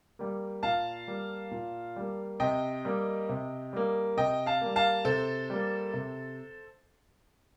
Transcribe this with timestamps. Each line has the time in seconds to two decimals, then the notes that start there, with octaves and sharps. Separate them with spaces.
0.19 G3 A#3
0.63 A#2 F5 A5
1.08 G3 A#3
1.51 A#2
1.96 G3 A#3
2.40 C3 D#5 G5
2.85 G3 A#3
3.29 C3
3.73 G3 A#3
4.17 C3 D#5 G5
4.46 F5 A5
4.61 G3 A#3
4.76 F5 A5
5.05 C3 A4 C5
5.50 G3 A#3
5.94 C3